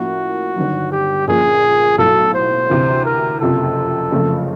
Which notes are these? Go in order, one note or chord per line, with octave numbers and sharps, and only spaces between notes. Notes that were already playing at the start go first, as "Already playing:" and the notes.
Already playing: A2 F3 A#3 C#4 E4 F#4
G1 G2 D#3 F#3
G4
A#1 A#2 F3 A#3 C#4 G#4
B1 A2 F#3 A3 A4
C5
D2 C3 E3
A#4
F#1 F2 C3 F3 A4
F#1 F2 C#3 F3 A3